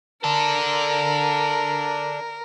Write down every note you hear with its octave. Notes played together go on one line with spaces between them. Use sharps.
D4 A4 A#4